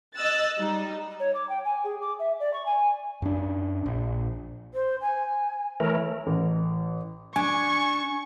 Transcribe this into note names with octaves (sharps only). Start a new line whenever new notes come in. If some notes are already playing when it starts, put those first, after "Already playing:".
D#5 E6 F#6 A6
G3 D#4
C#5
D6
G5
G#5
G#4
D6
E5
D5
C#6
G#5
F#2 D4
A#1
C5
G#5
E3 A3 A#4 C#5
A1
D4 G#5 C#6